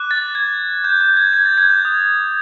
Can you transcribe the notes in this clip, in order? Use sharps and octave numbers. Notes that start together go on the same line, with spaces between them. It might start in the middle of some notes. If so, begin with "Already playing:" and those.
Already playing: D6 F#6
A6
G#6
G6
G6
G#6
G#6
A6
G#6
G6
D#6 G6